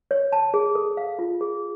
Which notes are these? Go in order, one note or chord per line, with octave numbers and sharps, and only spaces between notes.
C#5
A5
G#4
A4
F5
F4
G#4